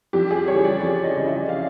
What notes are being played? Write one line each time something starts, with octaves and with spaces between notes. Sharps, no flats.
F2 G4
G#4
C#3 E3 G3 C#5
D5
F2 D5
D#5
C#3 E3 G3
E5
F5